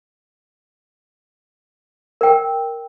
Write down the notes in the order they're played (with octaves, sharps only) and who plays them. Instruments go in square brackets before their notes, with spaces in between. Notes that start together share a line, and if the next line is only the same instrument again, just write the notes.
[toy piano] A#4 G5